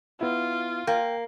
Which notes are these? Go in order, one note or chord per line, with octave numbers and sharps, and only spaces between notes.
B3 E4 F4
A#3 G5